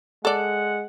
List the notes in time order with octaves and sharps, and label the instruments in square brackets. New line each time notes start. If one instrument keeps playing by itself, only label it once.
[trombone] G#3 [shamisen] A4 D5 [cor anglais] F#5